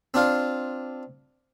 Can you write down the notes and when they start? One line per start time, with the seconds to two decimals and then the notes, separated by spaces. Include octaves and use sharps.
0.14 C4 D4 F4 F5